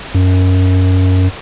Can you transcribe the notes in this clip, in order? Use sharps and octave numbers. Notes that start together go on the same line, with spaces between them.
F#2